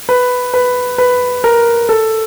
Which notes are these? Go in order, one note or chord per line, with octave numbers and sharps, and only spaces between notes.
B4
B4
B4
A#4
A4